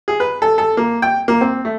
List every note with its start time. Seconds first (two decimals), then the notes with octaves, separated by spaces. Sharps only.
0.08 G#4
0.20 B4
0.42 A4
0.58 A4
0.77 A#3
1.02 G5
1.28 A#3
1.41 C4
1.65 A3